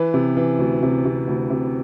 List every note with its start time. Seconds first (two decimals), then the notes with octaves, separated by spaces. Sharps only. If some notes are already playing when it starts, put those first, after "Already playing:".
Already playing: E3 B4
0.14 C3
0.37 E3
0.59 D2
0.83 C3
1.05 C3
1.28 D2
1.50 C3